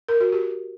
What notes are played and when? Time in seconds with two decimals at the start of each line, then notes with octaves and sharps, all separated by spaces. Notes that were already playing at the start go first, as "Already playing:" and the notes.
0.09 A#4
0.20 F#4
0.32 G4